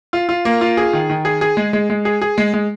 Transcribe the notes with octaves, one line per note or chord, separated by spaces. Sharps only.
F4
F4
A#3
F4
G#4
D#3
D#3
G#4
G#4
G#3
G#3
G#3
G#4
G#4
G#3
G#3